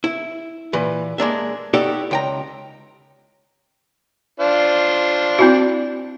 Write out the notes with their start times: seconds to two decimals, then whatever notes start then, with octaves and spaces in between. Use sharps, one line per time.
0.04 E4
0.73 A#2 E3 B4
1.18 G#3 A#3 D4 E5
1.74 D#4 E4 F#4 G4 A4 D5
2.11 C#2 G5 A#5
4.40 D4 F4 C5
5.39 C4 E4 F#4